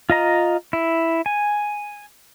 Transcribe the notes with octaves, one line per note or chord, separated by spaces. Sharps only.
F4 D#5 A#5
E4
G#5